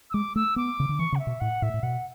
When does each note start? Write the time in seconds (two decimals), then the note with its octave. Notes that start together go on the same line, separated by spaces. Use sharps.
0.10 E6
0.14 G#3 D6
0.36 A3 E6
0.56 B3 D6
0.80 C#3
0.89 D3
0.99 E3 C#6
1.12 C#3
1.15 F#5
1.19 E5
1.27 B2
1.40 A2 F#5
1.62 A2 E5
1.74 A2
1.83 B2 F#5